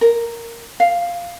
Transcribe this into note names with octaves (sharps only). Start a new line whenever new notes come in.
A#4
F5